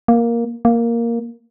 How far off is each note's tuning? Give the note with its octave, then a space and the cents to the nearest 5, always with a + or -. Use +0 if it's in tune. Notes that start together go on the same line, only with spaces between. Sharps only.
A#3 +5
A#3 +0